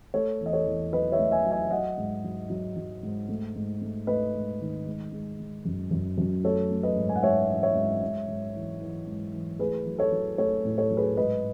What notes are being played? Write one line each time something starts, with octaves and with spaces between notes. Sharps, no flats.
A3 A4 C#5
E2
D#5
A4 C#5
E2
F#3 B4 D#5
C#5 E5
A3
E5 G#5
F#3
E5 G#5
F#3 D#5 F#5
G#2
F#3
F#3
F#3
G#2
A3
G#2
A3
A3 B4 D#5
G#2
D#3
G#3
G#3
G#3
F#2
F#2
F#2
A3 A4 C#5
A3
B4 D#5
G#2
G#5
F#5
G#2 C#5 E5
E3
C#5 E5
G#2
G#2
G#2
E3
E3
G#2
E3
A3 G#4 B4
F#3
A4 C#5
F#3
A3 A4 C#5
A2
A4 C#5
F#3
G#4 B4
G#2 B4 D#5